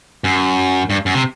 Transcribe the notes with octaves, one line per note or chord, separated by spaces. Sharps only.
F#2
G2
F#2
C3